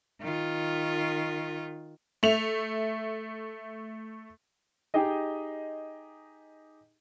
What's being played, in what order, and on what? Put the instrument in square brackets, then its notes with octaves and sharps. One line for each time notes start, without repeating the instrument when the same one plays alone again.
[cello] D#3 F4
[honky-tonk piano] A3 F7
[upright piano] D#4 G4 G#4 D#5